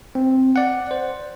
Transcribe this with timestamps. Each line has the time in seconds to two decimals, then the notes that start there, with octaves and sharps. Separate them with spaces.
0.15 C4
0.56 D5 F#5
0.91 C5